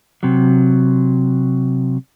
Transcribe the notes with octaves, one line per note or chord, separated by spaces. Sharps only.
C3 F#3